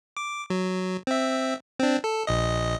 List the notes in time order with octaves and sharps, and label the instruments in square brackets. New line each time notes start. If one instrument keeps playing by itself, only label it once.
[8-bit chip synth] D6
F#3
C4 E5
C4 D4
A4
A#1 D#5